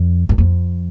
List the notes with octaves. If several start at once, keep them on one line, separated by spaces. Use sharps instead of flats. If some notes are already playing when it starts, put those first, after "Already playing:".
Already playing: F2
F#2
F2